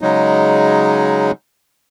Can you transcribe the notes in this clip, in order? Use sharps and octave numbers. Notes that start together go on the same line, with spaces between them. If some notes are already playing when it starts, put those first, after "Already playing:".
C#3 F#3 G#3 D#4